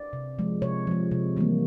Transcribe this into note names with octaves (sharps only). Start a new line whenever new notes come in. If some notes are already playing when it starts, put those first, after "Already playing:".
Already playing: D5
C3
F3 G#3
C3 C#5
F3 G#3
C3
E3 G3 A#3